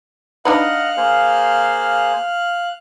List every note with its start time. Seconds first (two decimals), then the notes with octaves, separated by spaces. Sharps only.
0.45 D4 D#4 B4 D#5 F5 F#5 F6 F#6
0.97 A#3 G#4 C5